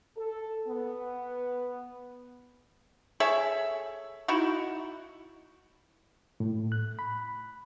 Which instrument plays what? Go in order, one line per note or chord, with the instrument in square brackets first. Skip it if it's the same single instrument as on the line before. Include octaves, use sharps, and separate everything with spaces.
[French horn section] A4
B3
[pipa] G#4 A4 C#5 E5
D#4 E4 F#4
[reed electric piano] A2
F#6
B5